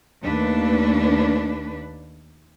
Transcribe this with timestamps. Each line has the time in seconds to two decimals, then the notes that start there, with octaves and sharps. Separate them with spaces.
0.23 D#2 A3 D4 B4